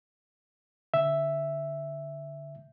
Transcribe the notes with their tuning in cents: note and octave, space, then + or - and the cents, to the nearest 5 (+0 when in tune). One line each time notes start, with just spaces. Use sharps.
D3 -15 E5 +0